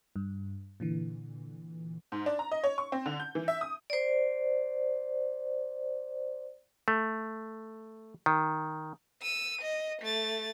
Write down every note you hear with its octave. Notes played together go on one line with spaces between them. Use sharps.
G2
A#2 D3 E3
G#2
D4
A#5
D#5
C#5
C#6
C4
D3
G6
E3
E5
D#6
C5 D5
A3
D#3
E6 D#7
D#5
A3 A6